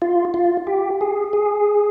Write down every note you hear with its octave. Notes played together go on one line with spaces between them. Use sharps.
F4
F4
G4
G#4
G#4